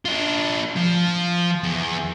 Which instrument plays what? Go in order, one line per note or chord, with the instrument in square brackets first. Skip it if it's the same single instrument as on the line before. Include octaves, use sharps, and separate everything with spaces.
[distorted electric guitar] D4 F4
F3
E2